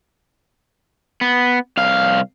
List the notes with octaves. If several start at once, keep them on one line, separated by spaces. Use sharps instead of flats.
B3
C2 F5